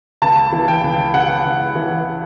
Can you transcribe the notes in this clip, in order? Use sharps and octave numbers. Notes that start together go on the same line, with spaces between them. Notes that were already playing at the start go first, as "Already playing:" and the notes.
C#2 A5
E3
G5
C#2
C#3 F#5
C#2
E3